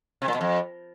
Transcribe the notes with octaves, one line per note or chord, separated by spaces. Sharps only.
C3
A#2
B2
F2